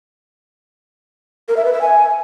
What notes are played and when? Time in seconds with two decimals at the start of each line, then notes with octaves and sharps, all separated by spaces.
1.48 A#4
1.57 E5
1.65 B4
1.73 E5
1.81 G#5